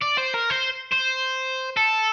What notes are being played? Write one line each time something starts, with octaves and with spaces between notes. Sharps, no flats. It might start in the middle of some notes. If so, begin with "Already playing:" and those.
D5
C5
A#4
C5
C5
A4